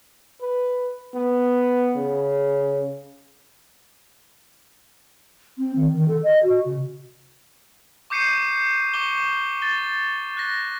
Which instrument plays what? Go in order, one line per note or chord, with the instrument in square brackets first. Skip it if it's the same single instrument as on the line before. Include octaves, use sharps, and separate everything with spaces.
[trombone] B4
B3
C#3
[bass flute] C4
D#3
D#3
A4
D#5
F#4
C#3
[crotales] C#6 D6 G6 C7 C#7 D#7
C#6 D6 G7
A6 G7
F#6 A#6